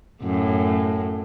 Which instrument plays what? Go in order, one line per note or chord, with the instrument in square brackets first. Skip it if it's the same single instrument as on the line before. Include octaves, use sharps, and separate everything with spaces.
[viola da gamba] F#2 A2